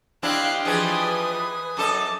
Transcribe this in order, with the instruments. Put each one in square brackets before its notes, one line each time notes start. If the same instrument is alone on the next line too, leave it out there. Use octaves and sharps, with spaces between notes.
[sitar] C4 D4 E4 [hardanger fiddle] G4 D#5 [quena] F5 [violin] F#6 C7
[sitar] E3 F3 G#4 [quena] B4 [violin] G#5 D#6
[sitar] F#2 A4 D#5 [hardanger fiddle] A5 [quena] D6